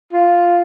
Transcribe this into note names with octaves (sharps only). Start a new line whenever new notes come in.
F4